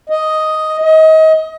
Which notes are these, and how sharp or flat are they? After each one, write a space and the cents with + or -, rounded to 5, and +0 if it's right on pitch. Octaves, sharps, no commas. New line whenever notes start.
D#5 +5
D#5 +30